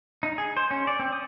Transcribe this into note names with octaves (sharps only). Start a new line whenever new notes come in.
D#4
G#4
C5
C#4
D5
C4
D#6